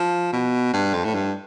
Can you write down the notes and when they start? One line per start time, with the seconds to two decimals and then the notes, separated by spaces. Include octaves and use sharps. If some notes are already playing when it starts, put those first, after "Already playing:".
Already playing: F3
0.33 B2
0.73 G2
0.93 F2
1.05 A2
1.14 G2